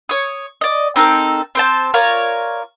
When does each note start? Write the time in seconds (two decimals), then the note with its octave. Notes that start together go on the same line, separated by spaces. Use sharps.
0.09 C#5 D#6
0.61 D5 D#5
0.96 C4 D#4 A4 A#4
1.55 C4 C5 A5
1.94 F4 A#4 C#5 D5